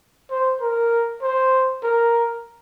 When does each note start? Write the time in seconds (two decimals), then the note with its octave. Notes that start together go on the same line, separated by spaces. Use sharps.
0.31 C5
0.61 A#4
1.22 C5
1.83 A#4